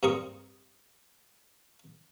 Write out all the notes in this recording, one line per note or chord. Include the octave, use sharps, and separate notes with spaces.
G2 C4 A#4 C#6 D#6